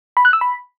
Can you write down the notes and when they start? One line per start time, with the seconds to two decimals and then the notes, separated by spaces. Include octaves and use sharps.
0.17 B5
0.25 F#6
0.33 E6
0.41 B5